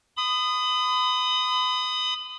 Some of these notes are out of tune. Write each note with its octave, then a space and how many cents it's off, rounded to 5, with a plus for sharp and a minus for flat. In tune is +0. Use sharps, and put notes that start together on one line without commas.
B5 +35 D#6 -10